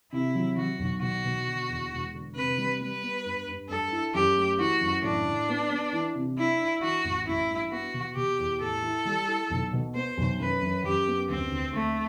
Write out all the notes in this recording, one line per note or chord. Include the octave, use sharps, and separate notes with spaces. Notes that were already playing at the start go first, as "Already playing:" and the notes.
C3 E4
F#3
F#3 F#4
B1
B2 F#4
B2
D3
E2
E1
D3
C3 B4
G3
G3 B4
B3
G2
G2
G2 A4
E4
F#2 G4
A3
E3 F#4
F#2
A2 D4
A2
B3
B3
E3
C3
D4 E4
D4
E3 F#4
A1
A1 E4
G2
B3 F#4
B2
B2 G4
E2
A2 A4
E4
G3
E4
B1
B2
B3 C5
B1
F#2 B4
F#2
F#2 G4
B3
D2 C4
D2
D2 A3